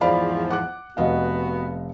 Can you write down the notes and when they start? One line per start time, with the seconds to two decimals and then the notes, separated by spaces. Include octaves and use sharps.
0.01 E2 G#2 F3 D5 F5 B5
0.50 F#5 D6 F#6
0.97 F1 B3 F#4 D#5 F5